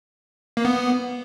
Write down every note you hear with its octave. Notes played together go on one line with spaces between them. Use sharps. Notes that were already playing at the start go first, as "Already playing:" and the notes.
A#3
B3